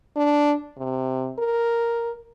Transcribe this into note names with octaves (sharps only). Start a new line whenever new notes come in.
D4
C3
A#4